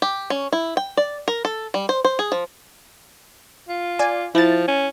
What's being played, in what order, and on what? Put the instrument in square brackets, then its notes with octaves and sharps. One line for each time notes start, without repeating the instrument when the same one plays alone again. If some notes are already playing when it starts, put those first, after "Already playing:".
[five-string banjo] G4
C#4
E4
G5
D5
A#4
A4
G3
C5
C5
G#4
F3
[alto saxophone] F4
[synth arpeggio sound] D5 G#5
[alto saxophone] F3 [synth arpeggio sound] E4 A6
[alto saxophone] C#4